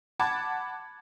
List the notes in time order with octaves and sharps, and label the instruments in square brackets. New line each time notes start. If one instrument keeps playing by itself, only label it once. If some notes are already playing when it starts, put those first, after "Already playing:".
[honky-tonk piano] F#5 A5 B5 D6 G#6